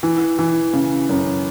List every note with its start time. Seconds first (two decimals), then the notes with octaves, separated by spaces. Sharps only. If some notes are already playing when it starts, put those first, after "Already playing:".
0.03 E3
0.39 E3
0.73 C#3
1.09 F#2